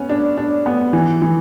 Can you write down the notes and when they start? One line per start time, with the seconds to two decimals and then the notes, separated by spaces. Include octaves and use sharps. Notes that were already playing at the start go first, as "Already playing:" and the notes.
Already playing: B3 C#4
0.09 D4
0.38 D4
0.66 B3
0.93 E3
1.22 E3